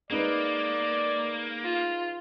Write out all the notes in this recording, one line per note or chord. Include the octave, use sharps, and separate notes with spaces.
G#3 A#3 D#4 B4 D5
F4